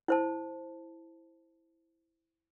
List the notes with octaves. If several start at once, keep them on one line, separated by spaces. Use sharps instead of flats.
E4 C5 A5